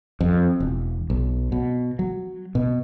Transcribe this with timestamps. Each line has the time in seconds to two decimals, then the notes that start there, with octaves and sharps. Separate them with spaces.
0.20 F2
0.60 E1
1.10 B1
1.52 B2
1.99 F#3
2.55 B2